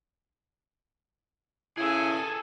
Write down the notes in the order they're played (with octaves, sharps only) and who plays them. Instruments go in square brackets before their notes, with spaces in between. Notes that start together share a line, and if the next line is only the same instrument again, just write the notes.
[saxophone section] C#3 E4 [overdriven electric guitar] G#4 A4 [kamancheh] G#5